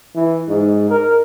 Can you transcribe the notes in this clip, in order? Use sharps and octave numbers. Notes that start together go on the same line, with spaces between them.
E3
G#2
A#4